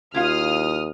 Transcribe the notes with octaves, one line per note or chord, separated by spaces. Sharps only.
D#2 E4 F4 F5 D#6 F6